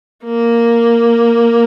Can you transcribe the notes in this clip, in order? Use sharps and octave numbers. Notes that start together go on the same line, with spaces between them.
A#3